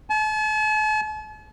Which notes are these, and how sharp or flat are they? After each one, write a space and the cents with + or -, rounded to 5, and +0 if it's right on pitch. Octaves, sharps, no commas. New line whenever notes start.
A5 -45